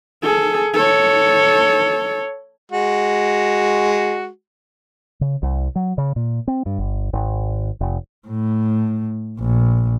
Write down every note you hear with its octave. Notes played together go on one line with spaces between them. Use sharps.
G#4 A4
A4 C#5
G#3 F#4
C#3
C2
F#3
C#3
A#2
C4
G2
G1
G#1
F1
A2
A#1